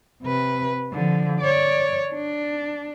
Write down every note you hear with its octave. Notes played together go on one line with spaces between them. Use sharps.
C3 B4
D3 F3
C#5 D5
D4